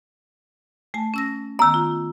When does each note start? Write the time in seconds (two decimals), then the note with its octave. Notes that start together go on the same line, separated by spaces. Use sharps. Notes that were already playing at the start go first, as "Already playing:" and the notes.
0.94 A3 G#5 A5
1.14 C#4 E6 A#6
1.59 D#3 B3 A#5 E6
1.74 F4